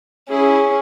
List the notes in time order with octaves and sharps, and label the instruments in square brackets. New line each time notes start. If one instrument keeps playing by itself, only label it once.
[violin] C#4 [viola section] E4 G#4